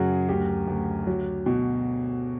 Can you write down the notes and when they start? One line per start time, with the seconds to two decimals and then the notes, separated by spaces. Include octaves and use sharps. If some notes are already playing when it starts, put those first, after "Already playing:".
Already playing: F#2 C#3 F#4 G#4
0.29 D2 G4
0.67 D2
1.07 F#3
1.46 B2